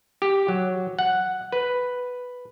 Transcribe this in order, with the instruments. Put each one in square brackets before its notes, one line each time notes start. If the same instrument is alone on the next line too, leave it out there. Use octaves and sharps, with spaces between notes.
[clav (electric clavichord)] G4
F#3
F#5
B4